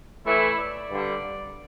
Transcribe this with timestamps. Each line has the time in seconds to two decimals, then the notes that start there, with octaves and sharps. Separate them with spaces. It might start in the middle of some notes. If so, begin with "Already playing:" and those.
0.24 A2 E3 A3 E4
0.58 D5
0.91 G2 D3 G3